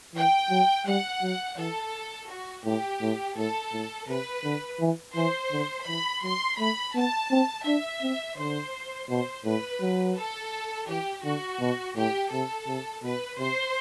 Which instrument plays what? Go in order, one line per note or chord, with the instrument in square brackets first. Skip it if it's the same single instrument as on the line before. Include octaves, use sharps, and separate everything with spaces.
[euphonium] E3 [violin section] G5
[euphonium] F#3
[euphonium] G3 [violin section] F#5
[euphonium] F#3
[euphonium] E3 [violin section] A4
[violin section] F#4
[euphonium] A2 [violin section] G4
[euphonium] A2
[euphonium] A2 [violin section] A4
[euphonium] A2
[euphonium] C3 [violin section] B4
[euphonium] D3
E3
[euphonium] E3 [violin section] C5
[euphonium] D3
[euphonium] E3 [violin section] B5
[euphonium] F#3 [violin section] C6
[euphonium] A3 [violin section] B5
[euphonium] B3 [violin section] A5
[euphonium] C4
[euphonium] D4 [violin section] E5
[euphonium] C4
[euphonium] D3 [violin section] C5
[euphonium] B2 [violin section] C5
[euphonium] A2 [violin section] B4
[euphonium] F#3
[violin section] A4
[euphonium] E3 [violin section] G4
[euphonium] D3 [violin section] F#4
[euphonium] B2
[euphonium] A2 [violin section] G4
[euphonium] C3 [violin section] A4
[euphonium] C3
[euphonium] B2 [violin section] B4
[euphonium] C3 [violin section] C5